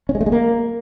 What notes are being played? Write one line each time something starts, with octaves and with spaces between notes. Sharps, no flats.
C#4
G#3
A3
G#3
A#3